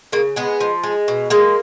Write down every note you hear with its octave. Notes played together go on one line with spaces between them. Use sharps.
C#3 A#3
G#3 B3
F3
G#3
B2
G#3 A#3